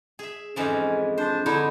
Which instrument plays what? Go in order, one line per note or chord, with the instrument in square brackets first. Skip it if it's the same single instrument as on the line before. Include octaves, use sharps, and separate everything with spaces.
[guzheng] G#4 E5
[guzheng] F2 G#2 E3 [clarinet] C#4
[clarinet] D4 [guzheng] C5
[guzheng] D3 D#4 [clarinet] E4